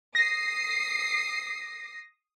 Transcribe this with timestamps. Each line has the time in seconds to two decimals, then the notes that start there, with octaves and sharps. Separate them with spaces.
0.15 D#6 A#6 C7